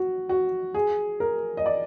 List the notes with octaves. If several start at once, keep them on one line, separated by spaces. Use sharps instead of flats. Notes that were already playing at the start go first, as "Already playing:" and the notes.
Already playing: F#4
F#4
G#4
A#4
D#5
D5